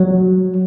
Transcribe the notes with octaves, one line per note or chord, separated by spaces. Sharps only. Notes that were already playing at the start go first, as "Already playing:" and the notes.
Already playing: F#3